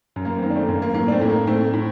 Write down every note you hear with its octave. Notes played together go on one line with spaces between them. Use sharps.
F#2
A#3
C4
D#3 A#3
D4
A3 C4
F#2 A#3
A#3
A2 A#3
D4
A3 C4
A2
A#3
A2 A3 C4
A2